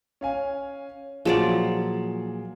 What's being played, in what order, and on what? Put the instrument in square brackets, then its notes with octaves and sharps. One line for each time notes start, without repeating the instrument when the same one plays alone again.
[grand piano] C#4 F5 G#5
[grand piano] A#2 G#4 E7 [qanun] F3 F#3 D5